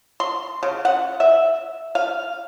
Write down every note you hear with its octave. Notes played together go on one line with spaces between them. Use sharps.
C6
C#3
F#5
E5
F5